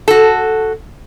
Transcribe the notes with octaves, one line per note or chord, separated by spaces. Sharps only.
F#4 A4